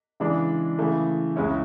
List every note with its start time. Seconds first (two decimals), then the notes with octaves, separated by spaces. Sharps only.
0.20 C#3 E3 G#3 D4
0.79 C#3 E3 A3
1.36 C#2 C#3 G#3 C#4 E4